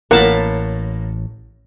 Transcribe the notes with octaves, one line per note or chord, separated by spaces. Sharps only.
A1 A2 A#3 A#4 C#5 F#5 A5 B5